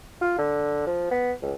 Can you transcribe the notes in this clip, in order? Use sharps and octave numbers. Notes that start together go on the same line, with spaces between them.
F4
D3
F3
B3
C#2